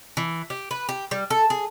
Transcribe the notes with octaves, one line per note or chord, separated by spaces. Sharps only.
E3
G4
B4
G4
G3
A4
G#4